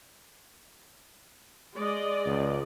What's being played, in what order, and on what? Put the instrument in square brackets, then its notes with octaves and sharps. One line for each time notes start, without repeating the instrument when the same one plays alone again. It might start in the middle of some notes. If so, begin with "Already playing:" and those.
[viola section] G#3 D5 D#5
[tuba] C#2